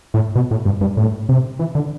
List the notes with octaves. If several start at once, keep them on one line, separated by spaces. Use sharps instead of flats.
A2
B2
A2
G2
G2
A2
C3
E3
D3